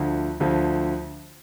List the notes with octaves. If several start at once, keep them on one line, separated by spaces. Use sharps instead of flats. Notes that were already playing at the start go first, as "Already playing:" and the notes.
Already playing: D2 D3 F3
D2 D3 F3